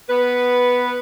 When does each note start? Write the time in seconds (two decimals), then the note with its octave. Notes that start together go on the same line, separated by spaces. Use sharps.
0.09 B3 B4